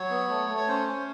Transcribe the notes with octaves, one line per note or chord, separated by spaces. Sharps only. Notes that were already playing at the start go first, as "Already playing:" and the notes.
Already playing: F#3 C#5
B3
A3
A3
C#5
C#4 C5
C#4